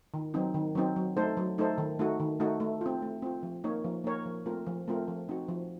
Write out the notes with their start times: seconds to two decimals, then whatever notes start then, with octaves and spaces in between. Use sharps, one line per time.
0.14 D#3
0.34 F#3 C4 D#4
0.54 D#3
0.75 F#3 C4 D#4
0.96 F#3
1.17 A3 D#4 A4 C5
1.37 F#3
1.58 A3 D#4 A4 C5
1.78 D#3
1.99 A3 D#4 F#4
2.20 D#3
2.40 A3 D#4 F#4
2.60 A3
2.81 C4 F4
3.02 A3
3.22 C4 F4
3.43 F3
3.64 A#3 D#4 A#4 C#5
3.84 F3
4.04 A#3 D#4 A#4 C#5
4.26 F3
4.46 A3 C4 F4 A#4
4.67 F3
4.88 A3 C4 F4 A#4
5.08 F3
5.29 C4 D#4 F#4
5.48 F3